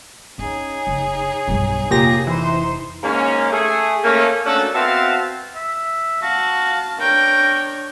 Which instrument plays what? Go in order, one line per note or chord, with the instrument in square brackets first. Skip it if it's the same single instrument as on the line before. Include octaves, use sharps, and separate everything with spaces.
[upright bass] C#4 [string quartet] D#4 G#4 C#5
[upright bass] F#1
B1 G2
[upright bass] F1 [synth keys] A#2 G4 A#6
[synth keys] E3 [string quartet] D#4 C5 C6
[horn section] G#2 A#3 C#4
A3 G#4
A3 A#3 C#4
A3 A#3 C#4 D4 F#4 A4
B3 C4 F#4 E5 F5 A5
[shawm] E5
[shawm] F#4 [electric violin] F5 A5
[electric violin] D4 C#5 [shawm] A#4 [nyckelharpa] G5